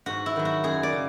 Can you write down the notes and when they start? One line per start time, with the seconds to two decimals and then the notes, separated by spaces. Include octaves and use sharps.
0.06 G#2 F#4
0.26 E4
0.36 D#3 F#3
0.45 F#4
0.64 F#2 G#4
0.83 D5
0.93 C#3